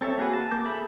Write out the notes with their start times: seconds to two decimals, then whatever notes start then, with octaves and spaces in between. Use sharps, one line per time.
0.01 C4 A4 C#5 E5
0.18 A#3 F#4 G#4 B4
0.33 A5
0.51 A#3 A#4 D6 G6
0.65 G#4 A4 E5 B5